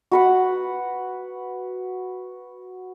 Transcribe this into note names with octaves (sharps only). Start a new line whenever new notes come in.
F#4 B4 F#5